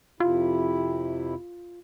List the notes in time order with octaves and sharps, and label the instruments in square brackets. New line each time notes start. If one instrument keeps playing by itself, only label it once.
[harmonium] F2 C3 E4 [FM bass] F4